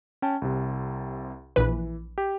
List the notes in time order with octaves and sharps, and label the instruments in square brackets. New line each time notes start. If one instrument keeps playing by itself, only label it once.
[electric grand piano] C#4 G5 A5
C2 C3
[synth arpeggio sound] A#1 B4 [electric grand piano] E3
[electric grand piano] G4